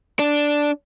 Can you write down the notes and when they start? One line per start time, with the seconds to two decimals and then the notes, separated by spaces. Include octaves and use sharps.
0.19 D4